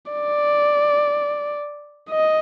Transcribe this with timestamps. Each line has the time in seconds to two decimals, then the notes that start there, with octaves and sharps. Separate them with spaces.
0.12 D5
2.10 D#5